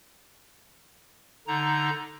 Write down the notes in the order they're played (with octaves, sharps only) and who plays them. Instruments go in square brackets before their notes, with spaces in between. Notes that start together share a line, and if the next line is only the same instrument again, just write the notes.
[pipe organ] D3 D#4 A#5